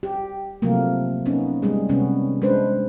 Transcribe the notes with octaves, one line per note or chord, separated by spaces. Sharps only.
G4
C3 F3 F#3 A3 A#3
A#3 B3 C#4 D#4
G3 G#3 G#4
C3 D#3 B3 C#4
G#3 D4 B4 C5